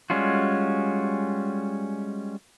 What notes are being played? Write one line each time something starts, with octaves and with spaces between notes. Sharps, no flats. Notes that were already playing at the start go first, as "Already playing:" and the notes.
G3 G#3 C#4 F4 F#4